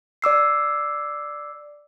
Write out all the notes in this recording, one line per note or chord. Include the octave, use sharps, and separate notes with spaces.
D5 D6 E6 C7